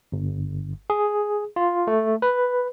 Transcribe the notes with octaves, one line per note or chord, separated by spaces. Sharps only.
G1
G#4
F4
A3
B4